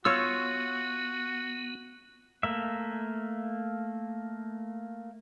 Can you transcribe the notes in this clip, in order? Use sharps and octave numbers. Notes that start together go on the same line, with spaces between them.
B3 F4 F#4 C#5 E6
A3 A#3 E5